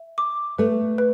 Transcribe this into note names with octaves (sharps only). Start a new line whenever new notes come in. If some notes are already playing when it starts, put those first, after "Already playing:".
Already playing: E5
D6
A3 B4
B4